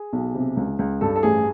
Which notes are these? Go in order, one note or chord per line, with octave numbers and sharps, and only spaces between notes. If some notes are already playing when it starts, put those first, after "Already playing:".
Already playing: G#4
B1
C3
C#2
C#2
G2 A4
A4
A1 G#4